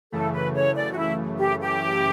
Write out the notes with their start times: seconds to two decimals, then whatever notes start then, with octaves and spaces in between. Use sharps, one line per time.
0.12 F#2 C#3 E3 A3 A4
0.33 B4
0.55 C#5
0.76 D5
0.91 F#4
0.97 E4
1.38 G4
1.60 G4